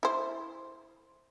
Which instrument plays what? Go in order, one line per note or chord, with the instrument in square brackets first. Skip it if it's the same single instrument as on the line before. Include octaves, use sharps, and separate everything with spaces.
[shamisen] E4 C5